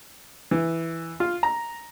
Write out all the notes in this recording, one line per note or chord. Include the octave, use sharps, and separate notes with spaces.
E3
F4
A#5